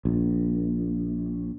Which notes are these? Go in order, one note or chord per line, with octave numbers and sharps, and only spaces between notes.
A#1